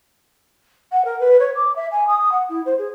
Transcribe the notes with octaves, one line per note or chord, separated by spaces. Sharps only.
F#5
A#4
B4
C#5
D6
E5
G#5
D#6
F#5
E4
C5
G#4